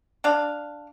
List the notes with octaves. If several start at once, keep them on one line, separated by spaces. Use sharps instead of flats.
D4 F5